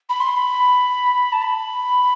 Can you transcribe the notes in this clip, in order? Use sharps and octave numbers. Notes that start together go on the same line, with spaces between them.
B5
C6
C6
B5
A5
B5